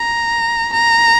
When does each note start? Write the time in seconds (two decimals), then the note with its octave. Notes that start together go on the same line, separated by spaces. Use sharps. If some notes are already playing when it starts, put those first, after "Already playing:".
Already playing: A#5
0.73 A#5